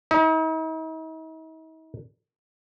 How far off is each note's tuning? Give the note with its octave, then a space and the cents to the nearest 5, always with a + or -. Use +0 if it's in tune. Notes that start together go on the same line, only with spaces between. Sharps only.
D#4 +45